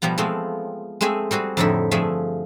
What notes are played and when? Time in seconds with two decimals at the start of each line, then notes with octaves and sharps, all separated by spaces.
0.02 B2 F3 G3 B3 A#5
0.18 F3 G#3 A3 B3 C4
1.01 G#3 A3 C4 G#4 E5 G#5
1.31 G3 C4 F#4 G#4
1.57 F2 A2 D3 D#4 E4
1.91 G2 F3 A3 G#4 E5